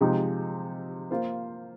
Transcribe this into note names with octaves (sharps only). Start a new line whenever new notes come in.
C3 F3 G#3 D#4 G4
A#3 F4 C5